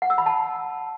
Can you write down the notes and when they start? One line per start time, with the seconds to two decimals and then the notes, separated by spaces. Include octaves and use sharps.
0.02 F#5
0.10 E6
0.18 B5
0.26 A5